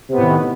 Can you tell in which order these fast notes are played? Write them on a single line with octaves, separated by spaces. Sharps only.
C3 B3 A2 D#3